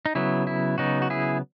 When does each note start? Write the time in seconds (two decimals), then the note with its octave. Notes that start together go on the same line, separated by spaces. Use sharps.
0.06 D#4
0.15 C#3 F#3 B3 E4
0.47 E4
0.78 C#3 F#3 B3 D#4 F#4
1.02 F#4
1.10 E4 G#4